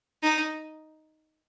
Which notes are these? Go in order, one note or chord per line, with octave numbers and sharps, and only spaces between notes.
D#4